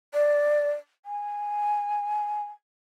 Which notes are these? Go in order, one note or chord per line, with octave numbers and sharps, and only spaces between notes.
D5
G#5